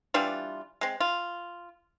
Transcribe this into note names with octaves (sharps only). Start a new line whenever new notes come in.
E3 G3 D4 F4
G#3 C4
F4